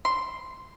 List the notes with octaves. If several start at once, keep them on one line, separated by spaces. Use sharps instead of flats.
C6